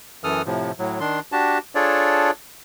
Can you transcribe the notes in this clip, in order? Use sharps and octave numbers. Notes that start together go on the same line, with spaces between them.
F#2 E3 A4 D#6 F6
A2 C3 F3
A2 F#3
D#3 D4 C6
D4 F#4 G4 A5
D4 F4 G#4 A4 C#5 D5